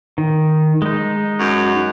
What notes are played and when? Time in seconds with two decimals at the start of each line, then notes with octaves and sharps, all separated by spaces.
0.18 D#3
0.82 G#3 D#4
1.40 F#2